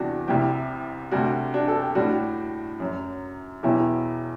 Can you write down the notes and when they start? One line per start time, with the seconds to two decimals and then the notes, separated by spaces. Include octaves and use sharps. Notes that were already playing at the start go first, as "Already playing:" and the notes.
Already playing: E2 C3 E3 G3 D4 F#4 G4
0.28 C2 C3 G3 E4 G4
1.11 D2 C3 G3 D4 F#4
1.54 D4 F#4
1.68 A4
1.82 G4
1.95 A2 G3 D4 F#4
2.80 F#2 F#3
3.63 E2 B2 F#3 E4 G4